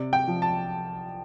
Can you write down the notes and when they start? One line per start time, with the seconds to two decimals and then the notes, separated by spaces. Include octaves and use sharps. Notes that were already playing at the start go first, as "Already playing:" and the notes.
Already playing: C3 D5
0.13 G5
0.28 F3
0.42 A5